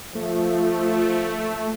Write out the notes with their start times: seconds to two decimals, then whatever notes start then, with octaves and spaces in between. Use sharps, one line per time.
0.15 F3 A3